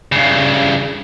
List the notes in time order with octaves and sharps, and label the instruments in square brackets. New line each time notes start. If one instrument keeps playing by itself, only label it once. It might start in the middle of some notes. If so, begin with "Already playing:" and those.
[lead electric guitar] G2 C#3